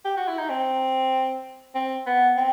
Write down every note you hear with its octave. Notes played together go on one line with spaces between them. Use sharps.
G4
F#4
E4
D#4
C4
C4
B3
C4